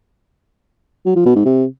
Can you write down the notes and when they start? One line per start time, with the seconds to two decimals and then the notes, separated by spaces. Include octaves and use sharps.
1.06 F#3
1.16 F3
1.26 B2
1.35 G#2
1.45 C3